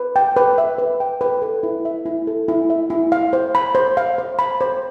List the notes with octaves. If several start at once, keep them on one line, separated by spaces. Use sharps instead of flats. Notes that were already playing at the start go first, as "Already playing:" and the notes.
Already playing: B4
G5
B4
E5
B4
G5
B4
A4
E4
E5
E4
A4
E4
E5
E4
F5
C5
B5
C5
F5
C5
B5
C5